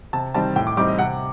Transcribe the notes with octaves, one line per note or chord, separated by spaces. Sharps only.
C3 A5
D#3 G3 C4 D#4 A5
A2 G5
D6
G3 C4 D#4 D6
D#5
C3 F#5